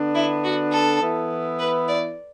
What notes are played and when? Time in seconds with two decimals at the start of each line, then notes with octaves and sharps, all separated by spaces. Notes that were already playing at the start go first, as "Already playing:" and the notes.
Already playing: D3 B3 D4
0.15 E4
0.44 F#4
0.72 A4
1.02 E3 B3 E4
1.59 B4
1.88 D5